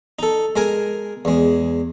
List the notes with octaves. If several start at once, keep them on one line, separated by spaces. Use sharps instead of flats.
D#4 A4
G#3 A#4 G#5
E2 G#3